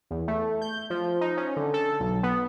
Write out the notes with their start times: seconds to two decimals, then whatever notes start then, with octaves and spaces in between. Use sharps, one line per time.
0.11 E2
0.28 A3
0.62 G6
0.90 F3
1.21 D#4
1.37 C#4
1.57 D3
1.74 A4
2.00 B1
2.23 B3